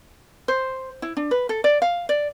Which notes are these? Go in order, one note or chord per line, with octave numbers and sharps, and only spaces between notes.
C5
E4
D4
B4
A4
D5
F5
D5